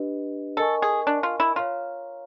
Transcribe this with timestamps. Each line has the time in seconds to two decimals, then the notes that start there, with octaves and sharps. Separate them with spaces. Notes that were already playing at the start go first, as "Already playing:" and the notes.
Already playing: D4 G4 B4 D#5
0.57 A4 A#4 D#5 G#5 C#6
0.82 G#4
1.07 D4
1.23 F4
1.40 E4
1.56 F4 C#5 F5 A#5